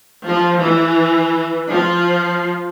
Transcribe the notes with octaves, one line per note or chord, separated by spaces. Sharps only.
F3
E3
F3